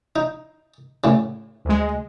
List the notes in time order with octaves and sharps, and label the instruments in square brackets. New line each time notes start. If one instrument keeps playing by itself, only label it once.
[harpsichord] D#4
A2 C#3
[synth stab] D2 G#3